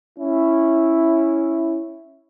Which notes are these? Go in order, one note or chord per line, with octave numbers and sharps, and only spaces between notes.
C#4 E4